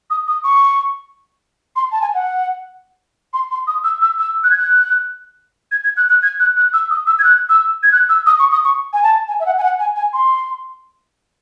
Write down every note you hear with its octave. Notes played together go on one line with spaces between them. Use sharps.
D#6
D#6
C#6
C6
A5
G#5
F#5
C6
C6
D#6
E6
E6
E6
F#6
G#6
F#6
G#6
G#6
F#6
F#6
G#6
F#6
F#6
E6
D#6
E6
G#6
F#6
E6
G#6
F#6
E6
D#6
C#6
D#6
C#6
G#5
A5
G#5
E5
F#5
G#5
F#5
G#5
G#5
C6